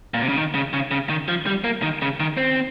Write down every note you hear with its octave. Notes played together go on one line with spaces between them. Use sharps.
A#2
C3
C#3
D#3
C#3
C#3
C#3
D#3
F3
G3
A#3
D#3
C#3
D#3
C4